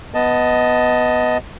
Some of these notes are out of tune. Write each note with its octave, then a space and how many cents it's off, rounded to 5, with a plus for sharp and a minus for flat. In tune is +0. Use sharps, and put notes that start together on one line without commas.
B3 +0 D#5 +10 A5 +5